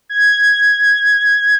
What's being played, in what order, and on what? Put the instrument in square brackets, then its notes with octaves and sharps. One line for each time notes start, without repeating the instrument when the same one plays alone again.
[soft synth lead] G#6